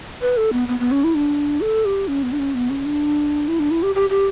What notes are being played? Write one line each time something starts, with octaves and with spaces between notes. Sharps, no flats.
B4
A4
B3
B3
B3
C#4
E4
D4
A4
G4
C#4
B3
D4
C#4
B3
C#4
D4
E4
D4
E4
G4
G4
G4